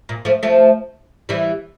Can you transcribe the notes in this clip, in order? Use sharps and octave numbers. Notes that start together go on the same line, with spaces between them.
A#2
F3 A3
F3 A3
E3 G3